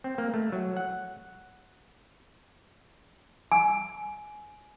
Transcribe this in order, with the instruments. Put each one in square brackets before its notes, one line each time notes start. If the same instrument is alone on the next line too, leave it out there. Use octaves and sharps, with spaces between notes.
[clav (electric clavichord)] C4
A#3
A3
F#3
F#5
[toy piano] G#5